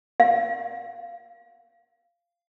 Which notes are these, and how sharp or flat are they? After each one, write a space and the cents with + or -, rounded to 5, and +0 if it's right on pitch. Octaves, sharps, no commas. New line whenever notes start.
F5 -10